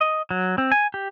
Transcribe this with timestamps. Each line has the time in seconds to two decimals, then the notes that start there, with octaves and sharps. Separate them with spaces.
0.01 D#5
0.31 F#3
0.58 C4
0.72 G#5
0.94 G4